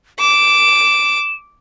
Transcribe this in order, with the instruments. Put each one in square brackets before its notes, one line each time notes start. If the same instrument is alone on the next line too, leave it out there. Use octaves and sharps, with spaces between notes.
[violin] D6 [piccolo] E7